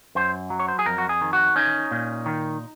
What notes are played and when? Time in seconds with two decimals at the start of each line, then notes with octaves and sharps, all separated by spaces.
0.15 F#2 C5
0.50 F#3
0.60 C#5
0.68 C5
0.79 G#4
0.86 F2 A#4
0.98 F#4
1.09 G#4
1.21 D#3
1.33 F#4
1.56 C#4 D#4
1.91 A#2
2.26 D#3